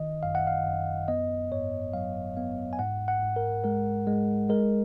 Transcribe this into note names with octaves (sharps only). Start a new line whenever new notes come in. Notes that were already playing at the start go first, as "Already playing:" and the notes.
Already playing: G#1 D#3 D#5
F#2 F5
F#5
F5
F#2
B3 D#5
G#2 C#5
F#3 F5
B3 F5
G#5
G#2 F#5
F#5
G#2
A#4
G#3 A#4
G#3
G#3 A#4